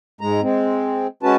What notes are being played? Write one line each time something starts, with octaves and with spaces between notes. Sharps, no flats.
G#2 G#3 A#5
G#3 C4
G#3 C#4 F#4 B4 A5